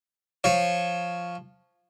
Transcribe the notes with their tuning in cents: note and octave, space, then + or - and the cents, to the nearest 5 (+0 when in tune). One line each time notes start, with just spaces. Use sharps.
F3 +0 C#5 +0